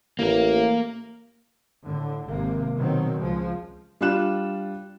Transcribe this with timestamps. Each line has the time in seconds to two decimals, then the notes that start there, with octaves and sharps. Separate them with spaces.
0.19 A1 A#3 A#4
1.83 A2 D3
2.27 G#1 C3 A#3
2.76 B2 D#3 F#3 C4
3.18 C#2 F3 G#3
4.01 G3 D4 F4 F#6 E7